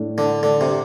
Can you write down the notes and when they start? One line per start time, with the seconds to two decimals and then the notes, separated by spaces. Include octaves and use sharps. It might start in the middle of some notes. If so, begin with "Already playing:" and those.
Already playing: A2 A3 D4
0.18 D3
0.43 D3
0.61 C3